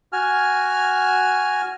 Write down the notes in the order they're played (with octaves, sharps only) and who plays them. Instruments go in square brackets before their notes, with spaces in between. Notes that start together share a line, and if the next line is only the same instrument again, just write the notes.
[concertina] F#4 G#5 F6